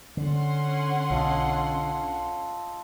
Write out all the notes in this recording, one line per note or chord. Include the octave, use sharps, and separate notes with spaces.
D3 C#4 F#5 C6
B1 F4 A4 D#5